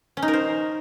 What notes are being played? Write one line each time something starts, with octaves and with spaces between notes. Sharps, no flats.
C#4
D#4
A#4
C5